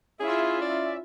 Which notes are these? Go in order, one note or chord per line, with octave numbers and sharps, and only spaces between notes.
C#4 E4 F4 G#4 E5
D5